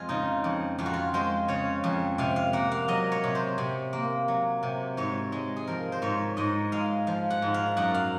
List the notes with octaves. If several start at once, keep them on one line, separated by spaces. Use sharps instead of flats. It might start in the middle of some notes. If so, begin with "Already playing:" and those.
Already playing: F2 G#3 F4 G#4
C#3 D#4
F2
F2 F4
F#4
F4
G#3 C5
C#3 C#5
F2
C3 F5
F5
A#3 F#5
F5
F#3 D#5
C#5
C3
C5
C3
A#3
F#3
C3
G#2 C#5
G#3
G#4
F3 A#4
C5
G#2 C#5
G#2 D#5
G#3 F5
F3 F5
F#5
G#2
F5
F#2 F#5
F5